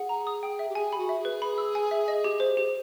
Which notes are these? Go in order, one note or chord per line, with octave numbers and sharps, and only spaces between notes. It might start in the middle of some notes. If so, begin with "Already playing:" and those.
Already playing: G#4 F#5
A#5
D#6
G5
E5
G4
G#4 G#5
B5
F#4
E5
G#4
B4
B5
E6
G#5
E5
D#5
G4
C5
G4